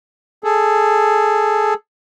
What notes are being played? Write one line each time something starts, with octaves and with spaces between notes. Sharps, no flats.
G#4 A4